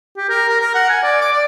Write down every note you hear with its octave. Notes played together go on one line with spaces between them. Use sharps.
G4
A#4
A#4
A#4
F#5
G#5
D5
D6
D5